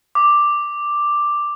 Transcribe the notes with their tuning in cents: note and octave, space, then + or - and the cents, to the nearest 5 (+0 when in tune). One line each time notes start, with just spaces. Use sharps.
D6 +5